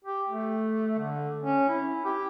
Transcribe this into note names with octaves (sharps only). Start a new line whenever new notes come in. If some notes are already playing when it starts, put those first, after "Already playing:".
G4
A3
D3
C#4
E4
G4